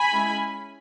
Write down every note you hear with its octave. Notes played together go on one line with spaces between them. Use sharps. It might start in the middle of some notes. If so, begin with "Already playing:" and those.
Already playing: G#5 B5
G#3 C#4 E4